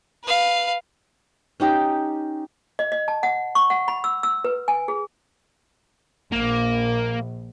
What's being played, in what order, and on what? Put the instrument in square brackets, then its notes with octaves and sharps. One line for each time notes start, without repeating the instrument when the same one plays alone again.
[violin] B4 F5
[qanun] C#4 D#4 G4
[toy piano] D#5
D#5
A5
F#5
C#6
F#5
B5
E6
E6
B4
G#5
G#4
[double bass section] A#1 [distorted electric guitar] A#3